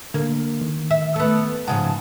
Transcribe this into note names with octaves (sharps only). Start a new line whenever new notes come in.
D3 A#3
D#3
E5
A3 B3
G#2 C#3 F3 F#5 A5